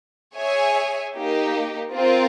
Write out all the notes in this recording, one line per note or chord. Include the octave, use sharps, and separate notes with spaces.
G#4 C#5 E5 G#5
A#3 D#4 G4
C4 F4 A#4